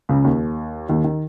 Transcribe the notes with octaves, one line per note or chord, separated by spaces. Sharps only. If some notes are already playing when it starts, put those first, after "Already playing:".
C#2 C#3
D#2 D#3
D#2 D#3
D#3